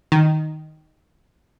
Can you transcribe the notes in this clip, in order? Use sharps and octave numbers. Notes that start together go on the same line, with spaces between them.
D#3